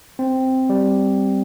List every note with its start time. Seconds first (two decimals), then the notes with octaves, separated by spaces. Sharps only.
0.19 C4
0.69 G3